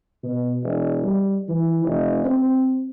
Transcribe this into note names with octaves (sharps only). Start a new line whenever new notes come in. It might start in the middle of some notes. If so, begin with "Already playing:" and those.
B2
E1
G3
E3
F1
C4